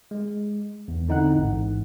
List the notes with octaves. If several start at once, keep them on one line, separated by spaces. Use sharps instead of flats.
G#3
E2
D3 C4 D#4 E4 F#5 F#6
A1 G#2